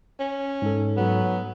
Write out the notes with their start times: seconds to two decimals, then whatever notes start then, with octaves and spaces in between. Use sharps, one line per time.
0.19 C#4
0.62 G#2 A4
0.97 F#3 B3